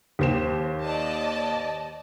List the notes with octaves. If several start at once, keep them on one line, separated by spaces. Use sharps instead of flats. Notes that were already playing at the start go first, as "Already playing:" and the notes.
D#2 G4 C5 E7
D5 D#5 A5